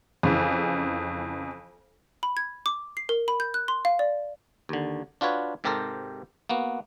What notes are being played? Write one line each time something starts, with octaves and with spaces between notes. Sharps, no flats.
F2 C#3 E3
B5
G#6
D6
C7
A#4
B5
G6
F#6
C6
F5
D5
D#2 D3
D4 F4 F#4 B4 C#5
G#2 C3 G4 A4 A#4 C5
A#3 B3 F#4